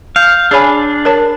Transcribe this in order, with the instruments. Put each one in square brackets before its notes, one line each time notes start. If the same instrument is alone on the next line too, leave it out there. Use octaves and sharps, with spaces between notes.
[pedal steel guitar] F5 [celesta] G6
[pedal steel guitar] D4 [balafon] G#4 C#5 G#5 [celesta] B5 C7
[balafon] A#4 C#5 A5